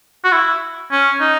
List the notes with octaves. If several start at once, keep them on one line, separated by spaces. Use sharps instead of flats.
F#4
E4
C#4
D#4